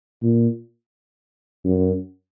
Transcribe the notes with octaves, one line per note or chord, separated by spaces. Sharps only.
A#2
F#2